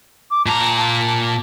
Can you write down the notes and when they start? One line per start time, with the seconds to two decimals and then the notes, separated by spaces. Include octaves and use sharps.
0.30 D6
0.46 A#2 A5 A#5
0.76 A5